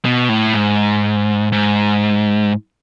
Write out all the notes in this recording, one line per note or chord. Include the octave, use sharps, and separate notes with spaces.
B2
A2
G#2
G#2